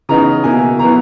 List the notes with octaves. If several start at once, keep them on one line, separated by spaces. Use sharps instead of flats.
C#3 E3 B3 D#4 A#5
B2 A#3 E4 G#5
B2 F#3 B3 E4 A#5